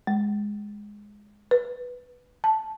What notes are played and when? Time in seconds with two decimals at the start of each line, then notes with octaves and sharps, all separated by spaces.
0.07 G#3
1.51 B4
2.44 A5